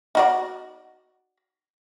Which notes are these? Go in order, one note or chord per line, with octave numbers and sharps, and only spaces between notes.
D#4 F#4 D5